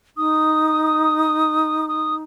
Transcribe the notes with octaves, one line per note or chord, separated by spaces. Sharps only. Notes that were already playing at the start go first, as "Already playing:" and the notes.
D#4 D#6
D#6